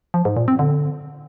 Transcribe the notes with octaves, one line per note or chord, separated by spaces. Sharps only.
F3
G#2
A#2
C4
D3